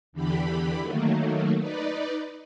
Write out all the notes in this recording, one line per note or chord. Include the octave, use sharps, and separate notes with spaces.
E2 D3 E3 G4 B5
D#3 F#3 A3 A#3
D#4 B4 D5